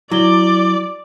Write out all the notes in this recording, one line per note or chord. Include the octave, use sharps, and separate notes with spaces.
F#3 E4 D5 G7